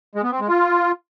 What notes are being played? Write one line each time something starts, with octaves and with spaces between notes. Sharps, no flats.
G#3
B3
C4
G#3
F4